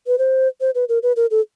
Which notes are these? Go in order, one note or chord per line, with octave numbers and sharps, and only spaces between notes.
B4
C5
C5
B4
A#4
B4
A#4
A4